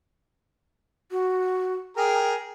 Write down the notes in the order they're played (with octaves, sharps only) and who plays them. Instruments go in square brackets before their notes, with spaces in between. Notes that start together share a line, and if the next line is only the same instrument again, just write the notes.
[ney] F#4
[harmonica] G#4 A#4 A#5 [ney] G5